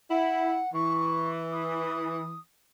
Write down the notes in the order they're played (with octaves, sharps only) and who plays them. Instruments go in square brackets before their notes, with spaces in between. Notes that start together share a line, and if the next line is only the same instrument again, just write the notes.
[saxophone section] E4 [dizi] F#5
[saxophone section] E3 [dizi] C#6
[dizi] D#6